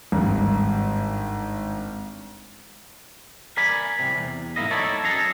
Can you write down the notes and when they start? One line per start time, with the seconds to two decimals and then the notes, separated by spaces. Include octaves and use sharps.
0.12 G#1 G2
3.57 A#4 D5 G#5 B5
3.99 C2 F2 C3
4.15 E2
4.56 B1 G#2 C3 A#3 E4 D#5
4.71 D#4 E4 A4 C#5 D5
5.04 F#2 G#4 A4 A#5